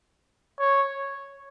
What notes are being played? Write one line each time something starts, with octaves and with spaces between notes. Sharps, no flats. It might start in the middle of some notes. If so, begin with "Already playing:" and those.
C#5